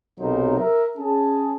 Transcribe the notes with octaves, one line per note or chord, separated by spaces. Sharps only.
B1 C3 F#3 D#4 A#4 C5
A#4 E5
C#4 G#4 A5